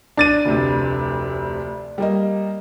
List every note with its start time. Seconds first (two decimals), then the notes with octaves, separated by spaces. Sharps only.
0.17 D4 A6 D#7
0.45 F1 D2 C3
1.98 G3 A#3 D#5